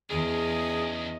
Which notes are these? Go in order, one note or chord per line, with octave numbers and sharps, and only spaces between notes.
E2 C#4 D4 G#4 D#5